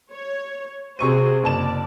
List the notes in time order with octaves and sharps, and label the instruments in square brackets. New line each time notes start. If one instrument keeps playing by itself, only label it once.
[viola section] C#5
[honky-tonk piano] C3 C#6 D#7 [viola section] F#4 G#4 C5
[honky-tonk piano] F#1 A5 E7 [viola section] D5